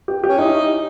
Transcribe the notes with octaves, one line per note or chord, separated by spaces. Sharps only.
G4
G4
C#4
D#4 E4